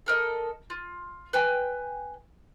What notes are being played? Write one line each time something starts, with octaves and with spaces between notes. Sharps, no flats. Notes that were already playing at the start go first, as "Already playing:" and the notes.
A4 A#4 D#5
F4
B4 G5 G#5